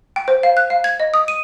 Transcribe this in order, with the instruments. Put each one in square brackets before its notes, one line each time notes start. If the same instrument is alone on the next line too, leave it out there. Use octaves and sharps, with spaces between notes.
[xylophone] G5
C5
F5
F#6
F5
G#6
D#5
D#6
D#7